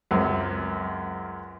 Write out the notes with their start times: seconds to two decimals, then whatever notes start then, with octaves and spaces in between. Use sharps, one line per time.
0.11 C#2 F#2 C4